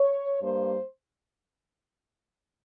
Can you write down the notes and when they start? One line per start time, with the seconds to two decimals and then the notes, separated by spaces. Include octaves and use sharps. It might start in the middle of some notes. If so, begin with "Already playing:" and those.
Already playing: C#5
0.41 G2 G3 A#3 C5